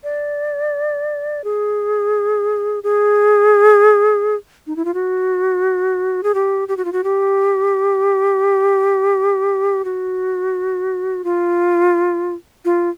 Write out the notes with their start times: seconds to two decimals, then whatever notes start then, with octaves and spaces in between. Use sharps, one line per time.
0.04 D5
1.44 G#4
2.83 G#4
4.67 D#4
4.76 E4
4.85 F4
4.94 F#4
6.23 G#4
6.35 G4
6.68 G4
6.77 F#4
6.85 F4
6.92 F#4
7.04 G4
9.85 F#4
11.24 F4
12.65 F4